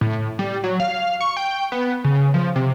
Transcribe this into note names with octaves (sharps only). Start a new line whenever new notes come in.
A2
G3
F#3
F5
C#6
G5
B3
C#3
F3
C3